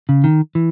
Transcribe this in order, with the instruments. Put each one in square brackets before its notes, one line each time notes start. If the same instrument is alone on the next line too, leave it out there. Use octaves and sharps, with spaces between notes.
[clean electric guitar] C#3
D#3
E3